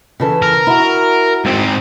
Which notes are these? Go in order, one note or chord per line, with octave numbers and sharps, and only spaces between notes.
C#3 E3 A4
A#4
E4 F#4
G#2 C4